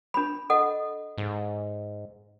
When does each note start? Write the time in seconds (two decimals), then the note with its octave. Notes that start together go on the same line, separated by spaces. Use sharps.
0.14 D4 B5
0.50 A4 D#5 F#5
1.18 G#2